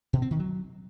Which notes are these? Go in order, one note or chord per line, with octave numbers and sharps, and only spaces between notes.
B2
C4
D#3
F#3